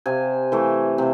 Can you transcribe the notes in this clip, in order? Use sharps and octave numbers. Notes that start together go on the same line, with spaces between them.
C3 G#5
E3 A3
C3